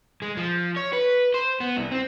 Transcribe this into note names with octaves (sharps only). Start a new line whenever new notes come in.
G#3
F3
C#5
B4
C5
B3
C2
C4